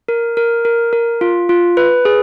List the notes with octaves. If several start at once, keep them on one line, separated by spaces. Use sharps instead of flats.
A#4
A#4
A#4
A#4
F4
F4
B4
G#4